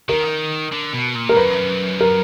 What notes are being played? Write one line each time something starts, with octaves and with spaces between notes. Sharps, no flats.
D#3 A#4
D3
B2
A#2
G#2 A#4
F#2 B4
A#4